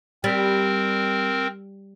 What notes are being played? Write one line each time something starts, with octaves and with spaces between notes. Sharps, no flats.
G3 C4 A#4